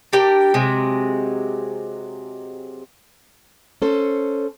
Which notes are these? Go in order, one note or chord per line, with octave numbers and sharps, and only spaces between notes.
D4 G4 A#4 G5
C3 F#3 G#3
C#4 A4 C5